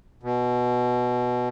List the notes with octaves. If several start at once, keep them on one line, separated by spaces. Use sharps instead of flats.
B2